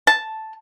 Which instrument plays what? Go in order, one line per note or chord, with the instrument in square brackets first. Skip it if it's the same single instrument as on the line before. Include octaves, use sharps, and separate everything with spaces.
[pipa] A5